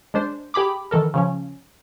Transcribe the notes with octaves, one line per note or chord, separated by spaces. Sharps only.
G#3 D4 C5
G4 G#4 B5 D6
D#3 E3 A4 A#4
C#3 F3 C#4